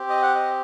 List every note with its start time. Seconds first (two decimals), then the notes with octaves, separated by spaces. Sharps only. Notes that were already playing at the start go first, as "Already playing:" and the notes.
Already playing: C4 G4
0.10 D#5
0.22 F#5
0.35 D#5